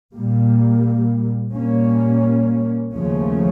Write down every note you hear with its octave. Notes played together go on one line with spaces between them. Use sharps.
A#2 G3 A#3
A#2 G3 A#3 C#4
D#2 C#3 F3 A3 C#4